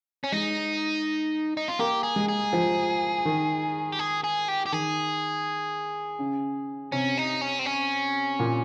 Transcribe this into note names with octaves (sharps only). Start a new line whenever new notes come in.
C#4
G#3 D#4
D#4
F4
A#3 G4
G#4
G#3
G#4
F3
D#3
G4
G#4
G#4
G4
G4
D#3 G#4
C#3
C3 C#4
D#4
C#4
C4
C#4
A#2